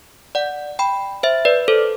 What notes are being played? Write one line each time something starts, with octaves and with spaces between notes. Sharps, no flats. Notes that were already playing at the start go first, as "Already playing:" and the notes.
D5 F#5
G5 B5
C5 E5
B4 D5
A4 C5